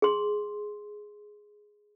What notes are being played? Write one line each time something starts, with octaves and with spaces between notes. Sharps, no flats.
G#4 C6